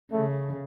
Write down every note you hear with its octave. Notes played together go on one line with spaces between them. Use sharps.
C#3 A3